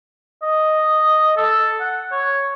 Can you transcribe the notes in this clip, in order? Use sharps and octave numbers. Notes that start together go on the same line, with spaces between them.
D#5
A4
F#5
C#5